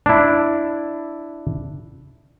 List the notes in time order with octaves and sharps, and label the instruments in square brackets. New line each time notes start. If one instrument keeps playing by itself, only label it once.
[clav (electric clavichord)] D4 E4